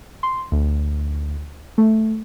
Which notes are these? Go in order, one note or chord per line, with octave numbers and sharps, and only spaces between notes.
C6
D2
A3